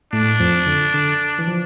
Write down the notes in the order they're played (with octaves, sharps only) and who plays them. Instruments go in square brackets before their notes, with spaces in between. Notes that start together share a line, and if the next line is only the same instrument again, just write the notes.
[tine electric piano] A2 A3 [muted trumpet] D4
[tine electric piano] F2 F3
D3
D3
E3
F3